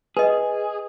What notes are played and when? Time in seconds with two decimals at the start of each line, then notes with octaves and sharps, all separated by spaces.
0.17 G#4 B4 D#5